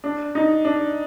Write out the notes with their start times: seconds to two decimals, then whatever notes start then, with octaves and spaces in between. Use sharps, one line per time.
0.04 D4
0.35 D#4
0.65 D4